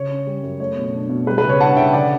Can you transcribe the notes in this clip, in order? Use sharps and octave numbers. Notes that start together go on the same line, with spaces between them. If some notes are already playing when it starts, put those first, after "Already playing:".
Already playing: C#3 C#5
C#4
G3
F#2
A3 C#5
B2
D4
B2
G3 B4
B4
C#3
C#5
D4 F#5 A5
C#3 E5 G5
D3 D5 F#5